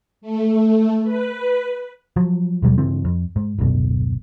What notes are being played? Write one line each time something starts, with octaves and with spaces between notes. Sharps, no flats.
A3
B4
F3 F#3
D#2 B2 F#3 G3
G2 C#3 E3 C4
F2
G#2
D1 G#1 F#2 B2